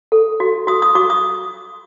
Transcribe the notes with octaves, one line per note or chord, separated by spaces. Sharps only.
A4
F#4
F#4 D#6
D#6
F#4 D6
D#6